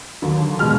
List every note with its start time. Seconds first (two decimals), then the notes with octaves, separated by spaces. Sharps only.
0.22 D#2 D3 F#3
0.59 B2 G#3 F6